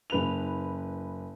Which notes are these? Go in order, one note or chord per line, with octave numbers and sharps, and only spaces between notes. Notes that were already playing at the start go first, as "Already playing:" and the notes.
F#1 B4 F7